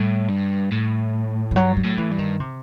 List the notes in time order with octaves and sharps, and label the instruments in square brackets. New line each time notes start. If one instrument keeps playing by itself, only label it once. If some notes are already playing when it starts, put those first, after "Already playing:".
Already playing: [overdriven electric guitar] A2 [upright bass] G3
[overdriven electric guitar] G2
A2
[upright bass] E3
[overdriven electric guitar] G2 [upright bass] F#3
[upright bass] F#3
[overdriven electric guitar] A2
[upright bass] E3
[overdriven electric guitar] G2
[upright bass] D#3
C3